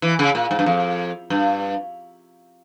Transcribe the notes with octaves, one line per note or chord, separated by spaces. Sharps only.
E3
C#3
A#2
G#2
G2
F2
G2